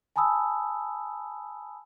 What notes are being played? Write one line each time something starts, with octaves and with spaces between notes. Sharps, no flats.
G#5 A5 B5 D#6 E6